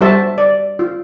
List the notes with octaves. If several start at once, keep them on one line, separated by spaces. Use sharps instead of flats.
G3 F#4 C5 E5 A5
D5
F4